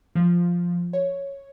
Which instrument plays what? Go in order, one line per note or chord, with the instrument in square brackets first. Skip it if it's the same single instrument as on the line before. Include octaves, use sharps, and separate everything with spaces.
[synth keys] F3
C#5